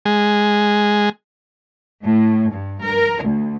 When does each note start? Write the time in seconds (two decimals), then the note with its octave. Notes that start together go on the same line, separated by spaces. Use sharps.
0.05 G#3
2.03 A2
2.52 G2
2.84 A#4
3.23 D2